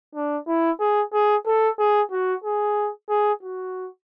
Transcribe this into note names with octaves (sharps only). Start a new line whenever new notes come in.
D4
E4
G#4
G#4
A4
G#4
F#4
G#4
G#4
F#4